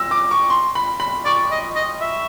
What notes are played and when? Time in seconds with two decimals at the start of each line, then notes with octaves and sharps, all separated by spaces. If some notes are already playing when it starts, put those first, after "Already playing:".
Already playing: E6 A#6
0.11 D6
0.31 C#6
0.50 C6
0.75 B5
1.00 B5
1.25 D5 C#6
1.51 D#5
1.76 D#5
2.01 E5